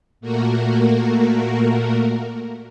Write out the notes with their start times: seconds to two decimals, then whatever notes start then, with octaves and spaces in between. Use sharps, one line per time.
0.21 A#2 A3 A#3 F#4 A#4